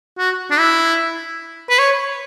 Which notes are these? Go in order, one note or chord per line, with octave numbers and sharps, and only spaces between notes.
F#4
D4
E4
B4
C#5